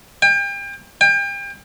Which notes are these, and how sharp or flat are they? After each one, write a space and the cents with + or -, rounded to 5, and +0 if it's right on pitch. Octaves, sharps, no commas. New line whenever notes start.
G5 +35
G5 +35